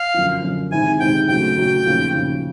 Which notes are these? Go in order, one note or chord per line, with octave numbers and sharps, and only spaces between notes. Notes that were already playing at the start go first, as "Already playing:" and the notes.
Already playing: F5
F#2 D3 F3
F#2 D3 F3
C3 D#3 G#3 C4 E4 G#5
C3 D#3 G#3 C4 E4 G5
C#3 F#3 A3 G5
C#3 F#3 A3
D#2 C#3 F3
D#2 C#3 F3